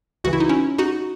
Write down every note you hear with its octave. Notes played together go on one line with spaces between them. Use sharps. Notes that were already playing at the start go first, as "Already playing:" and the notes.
C#2 C#3 E3 F#4
E4
D#4
C#4 E4
D#4 F#4